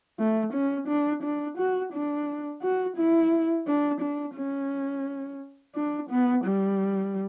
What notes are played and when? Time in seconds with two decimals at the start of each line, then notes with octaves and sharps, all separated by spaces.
0.19 A3
0.53 C#4
0.88 D4
1.23 D4
1.58 F#4
1.93 D4
2.62 F#4
2.97 E4
3.67 D4
4.01 D4
4.36 C#4
5.75 D4
6.10 B3
6.44 G3